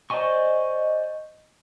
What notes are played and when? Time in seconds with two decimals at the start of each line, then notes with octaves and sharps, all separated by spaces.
0.10 C5 D5 D#5 G#5 C#6